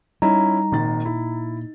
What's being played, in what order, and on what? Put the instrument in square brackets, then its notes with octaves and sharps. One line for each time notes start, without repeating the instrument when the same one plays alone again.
[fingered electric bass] G3 [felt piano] C#4 E4 [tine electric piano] D#4 [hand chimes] A#5
[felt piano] G#1 D#3 A6 [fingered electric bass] A#2
[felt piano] E4